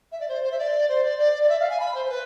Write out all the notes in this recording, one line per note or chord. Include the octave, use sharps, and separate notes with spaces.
E5
D5
C5
C5
E5
D5
C5
D5
D5
D5
E5
F5
G#5
B5
C5
C5
B4